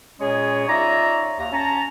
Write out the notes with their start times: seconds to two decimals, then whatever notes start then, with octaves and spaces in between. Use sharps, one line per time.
0.20 A#2 G#3 C#4 G#4 C#5
0.68 D#4 F4 C#5 D5 E5 A#5
1.39 D#2 A#5
1.52 C#4 A5 A#5